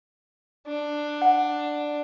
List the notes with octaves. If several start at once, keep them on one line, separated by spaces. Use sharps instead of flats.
D4
F#5